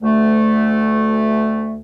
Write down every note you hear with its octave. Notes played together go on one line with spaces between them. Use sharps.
D2 A3